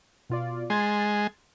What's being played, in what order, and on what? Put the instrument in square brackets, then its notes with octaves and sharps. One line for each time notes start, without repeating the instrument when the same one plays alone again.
[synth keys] B2 F4 D5
[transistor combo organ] G#3 [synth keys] C6 G#6 A6